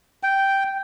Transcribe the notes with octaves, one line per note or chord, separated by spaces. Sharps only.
G5